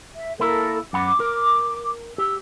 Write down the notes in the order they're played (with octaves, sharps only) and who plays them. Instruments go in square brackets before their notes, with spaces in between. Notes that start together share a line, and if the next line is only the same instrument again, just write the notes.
[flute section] E5
[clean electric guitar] A#3 E4 [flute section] A4 A#4
[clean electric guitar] F#2 F#5 B5 [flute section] D6
[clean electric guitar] A#4
[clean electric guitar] G4 [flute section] E6